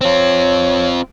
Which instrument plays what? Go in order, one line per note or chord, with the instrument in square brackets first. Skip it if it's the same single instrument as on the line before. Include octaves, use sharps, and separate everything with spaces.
[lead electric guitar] C4 F4 [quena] C#5